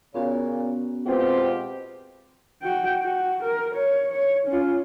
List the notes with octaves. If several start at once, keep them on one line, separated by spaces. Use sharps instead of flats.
A#2 C#3 B3 C#4 F#4
B2 G#3 C4 F4 G4
F#4 G5
F#4
A#4
C#5
C#5
C#4 F4